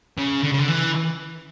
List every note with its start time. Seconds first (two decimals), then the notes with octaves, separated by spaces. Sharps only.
0.18 C#3
0.43 D3
0.51 C#3
0.59 D3
0.68 E3